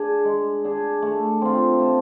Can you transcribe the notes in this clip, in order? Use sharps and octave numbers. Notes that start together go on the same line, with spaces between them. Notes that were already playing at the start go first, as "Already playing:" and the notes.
Already playing: D4 G#4
G#3
D4 G#4
A3
C4 F4
A3